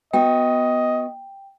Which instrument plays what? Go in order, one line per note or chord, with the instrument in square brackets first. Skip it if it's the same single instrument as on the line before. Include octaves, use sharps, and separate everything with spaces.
[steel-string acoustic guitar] B3 F#4 [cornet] D#5 [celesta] G5